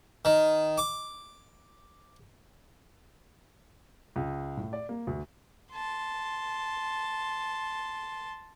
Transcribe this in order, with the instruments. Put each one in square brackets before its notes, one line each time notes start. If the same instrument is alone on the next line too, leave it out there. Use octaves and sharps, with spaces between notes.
[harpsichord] D#3
D6
[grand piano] C#2
A2
D5
A#3
D2
[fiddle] A5 C6